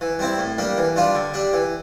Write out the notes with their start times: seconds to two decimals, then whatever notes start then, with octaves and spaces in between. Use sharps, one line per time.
0.01 E3
0.19 G3 C4 E4
0.38 A2
0.58 G3 A#3 D4
0.78 E3
0.96 G3 D4 F4
1.15 D3
1.34 G3 D4
1.53 E3